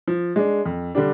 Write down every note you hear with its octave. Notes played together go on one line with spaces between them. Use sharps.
F3
G#3 D4
F2
D3 G3 D4